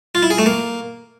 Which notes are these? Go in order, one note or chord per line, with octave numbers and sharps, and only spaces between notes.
F4
E4
G#4
A3
A#3